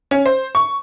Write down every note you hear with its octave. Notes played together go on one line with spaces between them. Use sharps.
C#4
C5
C#6